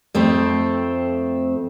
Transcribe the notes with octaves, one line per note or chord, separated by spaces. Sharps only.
F2 A3 C4